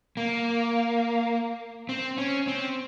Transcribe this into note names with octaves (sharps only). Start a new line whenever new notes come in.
A#3
C4
C#4
C4